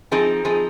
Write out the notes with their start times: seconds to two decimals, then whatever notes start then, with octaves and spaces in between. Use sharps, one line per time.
0.11 F3 C4 D#4 G#4
0.45 F3 C4 D#4 G#4